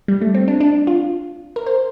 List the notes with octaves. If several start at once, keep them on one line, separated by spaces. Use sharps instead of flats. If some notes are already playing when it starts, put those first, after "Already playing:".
G3
A3
C4
D4
D4
F4
A#4
C5